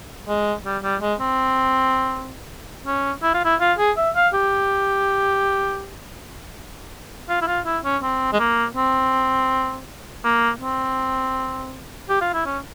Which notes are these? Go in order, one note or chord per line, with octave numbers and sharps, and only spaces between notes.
G#3
G3
G3
G#3
C4
C#4
E4
F4
E4
F4
G#4
E5
F5
G4
F4
E4
F4
E4
C#4
C4
G#3
A#3
C4
A#3
C4
G4
F4
E4
C#4